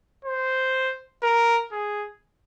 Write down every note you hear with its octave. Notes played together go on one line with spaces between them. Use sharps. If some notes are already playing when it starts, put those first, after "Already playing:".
C5
A#4
G#4